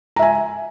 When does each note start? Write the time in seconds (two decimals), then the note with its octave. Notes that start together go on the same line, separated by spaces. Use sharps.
0.16 A#5
0.19 E5
0.22 G#5